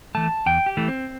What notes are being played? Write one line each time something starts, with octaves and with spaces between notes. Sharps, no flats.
E3 A3 A5
E2 G5
G4
E3 A3
C4